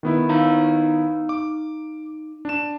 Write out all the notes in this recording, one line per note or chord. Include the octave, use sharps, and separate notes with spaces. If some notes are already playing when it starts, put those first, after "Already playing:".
D#3 B3 E4
D#4 F5 A#5
D6
D4 E7